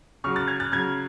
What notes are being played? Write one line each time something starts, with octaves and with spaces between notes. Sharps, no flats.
C#3 F#3 C#6 F6
F#6 A6
F6 G#6
F#6 A6
C#3 F#3 F6 G#6